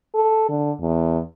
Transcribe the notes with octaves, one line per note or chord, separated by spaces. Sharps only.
A4
D3
E2